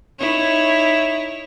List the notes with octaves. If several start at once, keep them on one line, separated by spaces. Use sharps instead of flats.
D#4 E4 C#5